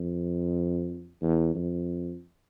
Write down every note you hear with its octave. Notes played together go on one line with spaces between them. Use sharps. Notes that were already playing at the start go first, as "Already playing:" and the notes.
Already playing: F2
E2
F2